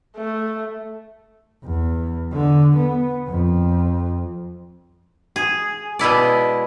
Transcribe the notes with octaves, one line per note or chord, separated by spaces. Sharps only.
A3
E2
D3
B3
F2
G#4
B2 G#3 E4 D5